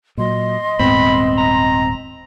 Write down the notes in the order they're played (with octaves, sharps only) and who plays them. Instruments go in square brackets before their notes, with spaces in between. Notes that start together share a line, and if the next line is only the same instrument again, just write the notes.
[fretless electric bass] A#2 F#3 [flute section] D#5 C6
[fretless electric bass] D#1 G#2 B3 [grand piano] C4 [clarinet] B5
[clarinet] A#5